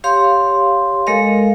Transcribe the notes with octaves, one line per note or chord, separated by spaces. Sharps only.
G4 C#5 F5 C6
G#3 A4 A#4 D#5 F5